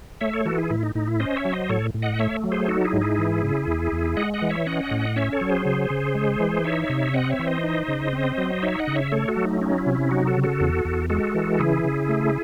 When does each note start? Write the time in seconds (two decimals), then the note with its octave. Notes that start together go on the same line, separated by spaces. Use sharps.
0.21 A3 C#5 E5
0.33 A4 C#5
0.45 E3 F#4 A4
0.58 E4 G#4
0.70 A2 E4
0.83 D#4
0.95 A2 D#4
1.08 E4
1.20 C#4 C5 D#5
1.36 C#5 E5
1.45 F#3
1.53 C5 D#5
1.69 A2 A4 C#5
1.94 A2
2.02 D#5 F#5
2.19 A3 C#5 E5
2.44 F#3
2.52 G#4 C5
2.68 D#4 F#4 A4
2.85 E4 G#4
2.93 G#2
3.01 E4 G#4
3.18 E3
3.43 C#3
3.67 E2
3.92 E2
4.17 G#3 D#5 F#5
4.34 D#5 F#5
4.42 E3
4.50 C#5 E5
4.66 C#4 D#5 F#5
4.91 A2
5.16 C#4 C#5 E5
5.32 A4 C#5
5.41 F#3
5.49 G#4 C5
5.66 C#3
5.90 C#3
6.15 G#3
6.40 E3
6.64 D#4 C#5 E5
6.89 C3
7.14 C4 D#5 F#5
7.30 C#5 E5
7.39 E3
7.47 C5 D#5
7.64 D#4
7.88 C#3
8.13 C4
8.38 F#3
8.62 D#4 C#5 E5
8.79 D#5 F#5
8.87 C#3
8.95 C#5 E5
9.12 A3 A4 C#5
9.28 F#4 A4
9.37 F#3
9.45 D#4
9.61 C#4 D#4
9.78 E4
9.87 C3
9.95 E4
10.11 F#3 D#4 F#4
10.27 F#4 A4
10.36 C#3
10.44 F#4 A4
10.60 E2
10.85 E2
11.10 G#3 F#4 A4
11.35 E3
11.59 C#3 E4 G#4
11.84 C#3
12.09 A3